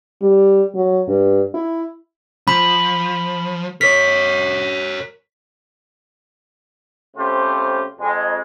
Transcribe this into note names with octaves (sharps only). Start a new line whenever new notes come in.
G3
F#3
G2
E4
F3 B5
A#4 C#5 B6
C#3 A3 C4 F4 G4 C5
F2 G#3